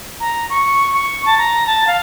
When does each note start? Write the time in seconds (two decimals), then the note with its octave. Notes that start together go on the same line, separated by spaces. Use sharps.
0.20 A#5
0.50 C#6
0.93 C#6
1.26 A5
1.38 A#5
1.67 A5
1.87 F5